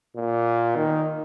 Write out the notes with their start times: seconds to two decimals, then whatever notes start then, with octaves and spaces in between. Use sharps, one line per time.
0.16 A#2
0.76 D#3